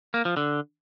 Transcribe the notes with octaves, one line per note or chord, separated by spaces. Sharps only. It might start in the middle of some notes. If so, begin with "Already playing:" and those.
A#3
F3
D3